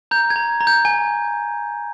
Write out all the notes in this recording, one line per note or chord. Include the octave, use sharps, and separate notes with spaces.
A#5 G6
G#6
A#5
A#5
G6
G#5